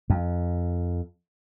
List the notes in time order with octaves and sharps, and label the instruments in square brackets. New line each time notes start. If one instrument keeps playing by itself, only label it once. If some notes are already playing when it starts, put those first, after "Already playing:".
[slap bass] F2